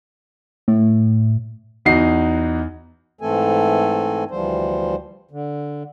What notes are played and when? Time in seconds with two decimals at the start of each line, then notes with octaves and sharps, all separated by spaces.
0.68 A2
1.85 E2 D#4 F#4 C7
3.21 G#2 E3 A3 C4 A4 G#5
4.31 D2 E3 F3 G3 C5
5.31 D3